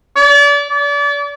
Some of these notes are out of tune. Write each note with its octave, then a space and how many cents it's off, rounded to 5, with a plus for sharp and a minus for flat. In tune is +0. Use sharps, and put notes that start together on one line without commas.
D5 -35
D5 -35